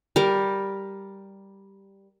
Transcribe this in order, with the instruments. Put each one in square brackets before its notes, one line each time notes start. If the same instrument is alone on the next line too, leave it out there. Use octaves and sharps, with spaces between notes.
[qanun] G3 A#4